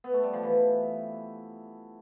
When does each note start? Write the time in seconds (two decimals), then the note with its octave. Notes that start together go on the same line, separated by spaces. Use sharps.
0.04 B3
0.14 A3
0.23 G3
0.33 F3
0.43 E3